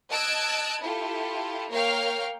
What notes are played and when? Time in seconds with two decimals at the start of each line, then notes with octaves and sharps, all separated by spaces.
0.10 D#5 A5 E6 F#6 G#6 D7
0.81 E4 F4 G4 A4
1.71 A#3 A#4 C#5 F5 G5 F6